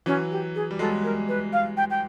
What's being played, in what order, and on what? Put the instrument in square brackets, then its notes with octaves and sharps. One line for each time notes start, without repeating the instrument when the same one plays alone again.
[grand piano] E3 F#3 [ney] C#4
[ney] G4
G#4
[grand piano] G3
[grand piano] F#3 G#3 [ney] A4
[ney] A#4
B4
F5
G5
G5